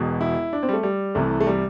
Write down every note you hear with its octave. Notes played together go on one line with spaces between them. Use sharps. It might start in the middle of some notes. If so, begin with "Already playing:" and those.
Already playing: E1 E2 B2
E4
D4
C4
G3
A3
G3
C2 C3 E3 A3
A3
G3